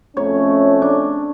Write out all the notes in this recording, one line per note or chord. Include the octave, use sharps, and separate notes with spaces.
F2 A3 C#4 C#5
D4